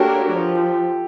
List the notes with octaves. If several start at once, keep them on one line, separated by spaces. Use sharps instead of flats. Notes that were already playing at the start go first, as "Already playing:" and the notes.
Already playing: A#3 D4 F#4 G4 A4 A#4 C#5
F3